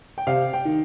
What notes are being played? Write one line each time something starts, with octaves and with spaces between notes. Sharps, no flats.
G5
C3 F5
G5
D#3